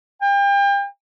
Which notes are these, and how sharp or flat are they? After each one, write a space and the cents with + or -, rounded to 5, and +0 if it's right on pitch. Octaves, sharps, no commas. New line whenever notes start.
G5 +35